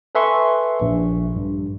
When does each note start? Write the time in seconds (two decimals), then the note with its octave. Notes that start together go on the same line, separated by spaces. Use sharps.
0.15 A4 B4 E5 G#5 C6 C#6
0.81 A#1
1.36 G2